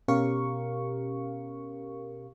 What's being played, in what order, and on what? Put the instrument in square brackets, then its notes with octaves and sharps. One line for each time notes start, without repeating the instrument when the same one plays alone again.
[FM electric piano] B2 C#4 G4 A#4 F5 C#6